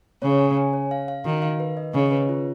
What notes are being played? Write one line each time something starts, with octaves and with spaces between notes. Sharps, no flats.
C#3 C#5
G#5
G#5
C#5
F5
F5
D#3 F#4
F5
B4
D#5
C#3 D#5
B4
F4